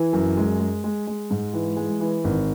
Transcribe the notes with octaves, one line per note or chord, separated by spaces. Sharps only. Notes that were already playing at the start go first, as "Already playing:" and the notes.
Already playing: E3
F#2
G#3
G#3
G#3
G#3
G#2
E3
G#3
E3
G#1